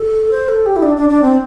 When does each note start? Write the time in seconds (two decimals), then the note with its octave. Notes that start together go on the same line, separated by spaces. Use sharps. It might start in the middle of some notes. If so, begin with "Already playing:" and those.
Already playing: A4
0.31 C5
0.48 A4
0.66 G4
0.76 E4
0.82 D4
0.96 D4
1.09 D4
1.22 C4